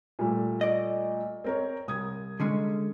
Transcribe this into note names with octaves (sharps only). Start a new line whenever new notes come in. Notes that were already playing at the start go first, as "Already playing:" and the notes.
A#2 G3 A3
D5 D#5
C4 A#4 C#5
C2 D#6 G#6
D3 G#3 C#4